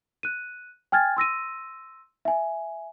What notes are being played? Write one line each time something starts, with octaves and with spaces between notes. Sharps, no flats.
F#6 D#7
G5 G#5 F6 G#6 A6
C6 E6 A#6 D#7
E5 G#5